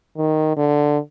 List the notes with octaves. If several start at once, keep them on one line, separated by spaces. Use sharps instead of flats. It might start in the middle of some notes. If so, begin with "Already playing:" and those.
D#3
D3